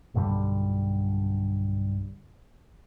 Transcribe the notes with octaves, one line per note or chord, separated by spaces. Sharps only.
B1 G2 D3 G3